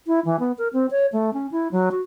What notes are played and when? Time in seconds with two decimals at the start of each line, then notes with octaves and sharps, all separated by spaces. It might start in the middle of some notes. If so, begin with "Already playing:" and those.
0.07 E4
0.25 E3
0.39 B3
0.58 A#4
0.73 C4
0.91 C#5
1.13 A3
1.33 C#4
1.52 E4
1.72 F#3
1.92 F#4